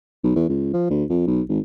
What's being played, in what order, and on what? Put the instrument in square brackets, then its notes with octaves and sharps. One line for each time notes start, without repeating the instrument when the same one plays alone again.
[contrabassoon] B1
E2
C#2
F3
D2
F2
B1
G#1